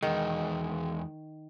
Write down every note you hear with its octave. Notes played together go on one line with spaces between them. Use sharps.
E2 D#3 G#3